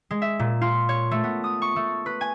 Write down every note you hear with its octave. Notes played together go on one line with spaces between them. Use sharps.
G#3
E5
A#2
F4
C#5
A3
B3
D#6
C#6
A3
B4
G#5